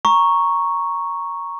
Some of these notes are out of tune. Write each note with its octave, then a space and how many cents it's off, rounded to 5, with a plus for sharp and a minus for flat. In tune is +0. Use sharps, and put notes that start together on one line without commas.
A#5 +0 C#6 +0